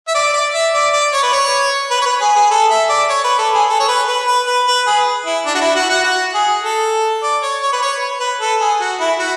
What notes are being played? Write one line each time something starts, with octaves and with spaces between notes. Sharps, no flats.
E5
D5
D5
E5
D5
D5
C#5
B4
C#5
B4
C#5
B4
G#4
G#4
A4
E5
D5
C#5
B4
A4
G#4
A4
C#5
B4
B4
B4
B4
B4
G#4
E4
D4
F#4
E4
F#4
F#4
F#4
G#4
A4
D5
C#5
C#5
B4
C#5
B4
A4
G#4
F#4
E4
F#4